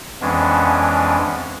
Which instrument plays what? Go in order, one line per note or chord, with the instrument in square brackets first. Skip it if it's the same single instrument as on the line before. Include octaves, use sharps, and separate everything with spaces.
[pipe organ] F2 E3 G#3 B3 C#4 D4